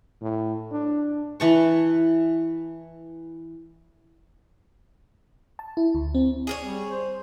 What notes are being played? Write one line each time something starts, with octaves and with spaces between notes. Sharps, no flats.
A2
D4
E3 A5 C#6
A5
E4
D2
C4
G#4 A#4 C#5
G3
C5